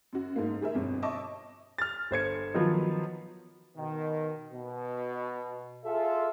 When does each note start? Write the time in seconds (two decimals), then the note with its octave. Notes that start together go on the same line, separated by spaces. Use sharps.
0.13 F#2 F#4
0.36 G#2 A3 A#3
0.61 G4 G#4 A#4 E5
0.75 G1 F2 B2
1.02 D#5 E5 A5 C#6 D6
1.78 F6 A6
2.11 G1 C5 G#6 C#7
2.54 D#3 F3 F#3 B3 F4
3.77 B2 D#3
4.51 B2
5.85 F4 G#4 A4 E5